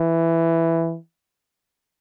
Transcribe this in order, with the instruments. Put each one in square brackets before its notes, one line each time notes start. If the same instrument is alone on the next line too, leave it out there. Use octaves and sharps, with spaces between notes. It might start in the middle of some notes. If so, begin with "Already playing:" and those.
Already playing: [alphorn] E3